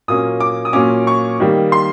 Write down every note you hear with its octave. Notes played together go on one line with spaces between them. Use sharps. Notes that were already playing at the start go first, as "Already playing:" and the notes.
A#2 F#3 A#3 C#4 D#6
D6
D#6
A#2 F#3 A#3 C#4 D6
C#6
D#3 G3 A#3
C6